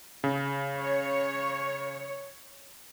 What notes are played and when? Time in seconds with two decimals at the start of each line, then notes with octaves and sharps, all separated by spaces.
0.24 C#3
0.79 C#5